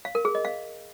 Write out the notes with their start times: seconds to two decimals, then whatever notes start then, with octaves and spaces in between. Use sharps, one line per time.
0.05 F5
0.15 A#4
0.25 G#4
0.35 D#5
0.45 F5